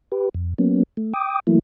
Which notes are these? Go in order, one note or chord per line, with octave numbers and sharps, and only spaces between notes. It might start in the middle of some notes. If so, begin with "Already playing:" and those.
G4 B4
F2
F#3 A#3 B3 C#4
A3
G5 D6 D#6
E3 F#3 A3 A#3 E4